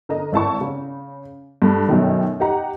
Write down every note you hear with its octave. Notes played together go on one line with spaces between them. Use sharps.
D3 A#4 D#5
G#1 E4 A5 C#6
C#3
G2 A3
F#2 B2 D#3 A3
D#4 G4 F#5 A#5